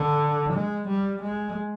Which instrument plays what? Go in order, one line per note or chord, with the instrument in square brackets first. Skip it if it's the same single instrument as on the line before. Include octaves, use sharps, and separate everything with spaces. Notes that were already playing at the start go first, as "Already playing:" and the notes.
Already playing: [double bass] D3
G#3
G3
G#3